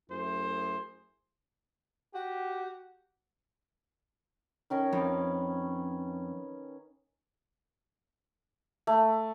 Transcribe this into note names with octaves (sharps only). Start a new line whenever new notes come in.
F#2 A3 E4 G#4 C5
F#4 G4
D#3 C#4 A#4
F2 B4 F5
A3